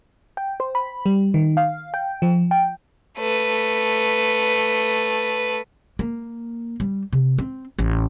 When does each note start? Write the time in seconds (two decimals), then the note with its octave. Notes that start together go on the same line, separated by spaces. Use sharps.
0.37 G5
0.60 C5
0.75 B5
1.06 G3
1.34 D#3
1.57 F5
1.94 G5
2.22 F3
2.51 G5
3.19 A3 B4
5.99 A#3
6.80 G3
7.13 C3
7.38 C4
7.79 A1